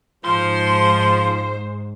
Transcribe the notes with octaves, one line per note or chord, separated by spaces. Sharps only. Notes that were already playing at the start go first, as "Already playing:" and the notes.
G#2 F3 C5 C6